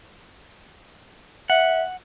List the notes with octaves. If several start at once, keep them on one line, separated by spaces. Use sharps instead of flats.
E5 F#5